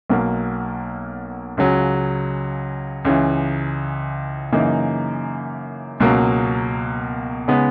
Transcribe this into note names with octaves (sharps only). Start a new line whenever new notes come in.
B1 B2 A#3
C#2 C#3 F#3
C#2 C#3 E3
F#2 C#3 E3 A#3 D#4
C#2 B2 F#3 A#3
C#3 G#3 B3 D#4